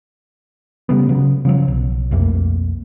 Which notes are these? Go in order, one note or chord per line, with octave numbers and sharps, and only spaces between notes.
C#3 G3 A3 B3
C#3 F#3
C#3 F3 F#3
B1
B1 F2 A3 A#3